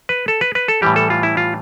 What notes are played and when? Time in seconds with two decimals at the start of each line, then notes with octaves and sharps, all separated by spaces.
0.09 B4
0.28 A4
0.41 B4
0.55 B4
0.68 A4
0.82 A2 E3 G3 G4
0.96 A4
1.10 F4
1.23 E4
1.37 F4